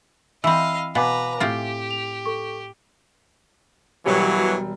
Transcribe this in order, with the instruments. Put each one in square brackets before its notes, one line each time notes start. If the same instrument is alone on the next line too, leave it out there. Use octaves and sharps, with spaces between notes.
[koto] E3 C4 [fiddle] D#5 F5 [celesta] B5 E6
[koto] B2 [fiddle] B4 A#5 [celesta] F5 G#5 D6
[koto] A2 C4 F4 [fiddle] G4
[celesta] F7
A4 C#6
[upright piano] E1 G3 [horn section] B2 E3 F#3